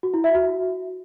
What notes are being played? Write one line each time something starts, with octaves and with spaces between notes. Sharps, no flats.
F#4
E4
E5
F#4